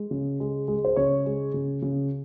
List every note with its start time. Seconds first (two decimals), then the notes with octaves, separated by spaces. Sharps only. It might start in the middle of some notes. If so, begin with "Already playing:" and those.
Already playing: G#3
0.11 C#3
0.40 G#3
0.68 G#3
0.85 C5
0.96 C#3 C#5
1.26 G#3
1.54 C#3
1.82 C#3